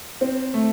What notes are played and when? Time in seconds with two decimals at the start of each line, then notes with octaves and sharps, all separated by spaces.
0.21 C4
0.54 A3